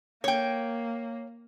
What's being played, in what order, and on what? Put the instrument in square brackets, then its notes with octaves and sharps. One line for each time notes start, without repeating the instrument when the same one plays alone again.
[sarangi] A#3 [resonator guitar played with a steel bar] C#5 G5